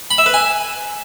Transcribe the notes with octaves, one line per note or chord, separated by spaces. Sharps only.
B5
E5
B4
G#5